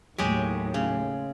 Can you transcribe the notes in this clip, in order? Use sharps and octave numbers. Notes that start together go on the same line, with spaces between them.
D#2 A2 F#3 G#3 G4
C#3